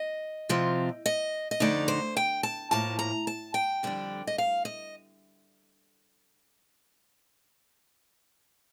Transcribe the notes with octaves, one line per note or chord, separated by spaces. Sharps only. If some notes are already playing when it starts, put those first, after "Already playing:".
Already playing: D#5
C3 F3 C4 F4
D#5
D#5
F2 D3 A3 D#4 D5
C5
G5
A5
A2 F3 A#3 A5
A#5
A5
G5
F2 D3 G3 D4
D#5
F5
D#5